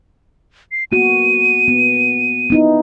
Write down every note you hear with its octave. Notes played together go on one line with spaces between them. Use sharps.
C7
A#3 B3 F#4 D#7
B3
B3 D#4 E4